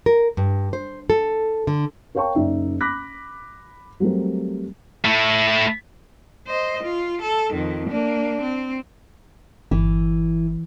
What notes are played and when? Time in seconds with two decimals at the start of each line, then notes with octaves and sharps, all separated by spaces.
0.06 A#4
0.37 G2
0.73 C5
1.10 A4
1.67 D3
2.15 A#4 C#5 F5 G5 A5 C#6
2.35 F#1 D#4 D5 E5
2.81 B5 D6 F#6 A#6 B6
4.00 F#3 G3 A3 C4 A#4
5.05 A3 E4
6.47 C5 D#5
6.83 F4
7.22 A4
7.52 F2 D#3
7.89 A#3 D4
8.41 C4
9.71 G1 E3